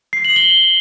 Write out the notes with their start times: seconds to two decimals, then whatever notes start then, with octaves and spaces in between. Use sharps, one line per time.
0.13 C7
0.25 F#7
0.36 G7